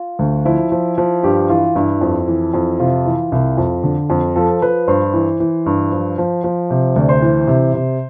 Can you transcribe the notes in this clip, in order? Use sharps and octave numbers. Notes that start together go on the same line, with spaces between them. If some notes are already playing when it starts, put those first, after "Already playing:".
Already playing: F4
D2
F3 E4
F3
F3
G2 G4
E3 F4
G2 E4
F2
E3
F2
C3 F4
E3
C2
F2
D3
F2
F3 A4
F3 B4
G2 C5
E3
E3
G2
F3
F3
F3
C3
D2 D5
C5
E3
C3
C3